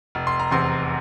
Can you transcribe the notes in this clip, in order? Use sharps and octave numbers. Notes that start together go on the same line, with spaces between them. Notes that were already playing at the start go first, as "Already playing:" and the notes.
F1
C6
A#5
E2 C3 C6